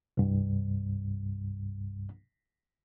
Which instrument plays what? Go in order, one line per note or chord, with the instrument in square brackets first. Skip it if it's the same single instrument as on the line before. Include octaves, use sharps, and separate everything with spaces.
[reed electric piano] C2 G2